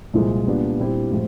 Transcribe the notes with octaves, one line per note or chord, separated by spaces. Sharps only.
C2 A#2 F3 G#3
A#2 G3 B3 D4
A#2 G3 C4 E4 G4
A2 F3 G#3